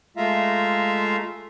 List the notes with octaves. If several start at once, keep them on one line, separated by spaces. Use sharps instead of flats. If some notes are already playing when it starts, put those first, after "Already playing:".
G#3 A3 F4 E5 F5 A#5